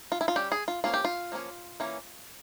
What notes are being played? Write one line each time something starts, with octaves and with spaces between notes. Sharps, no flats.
F4
E4
F4
G3 C#4 G4
G#4
F4
F3 A#3 C#4 F4
G4
F4
F3 A#3 C#4
E3 A#3 C#4